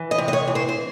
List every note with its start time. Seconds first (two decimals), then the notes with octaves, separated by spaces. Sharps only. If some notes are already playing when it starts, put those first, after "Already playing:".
Already playing: E3
0.11 D#5
0.18 C3
0.28 D#5
0.33 C#5
0.48 E3
0.55 C5
0.69 C5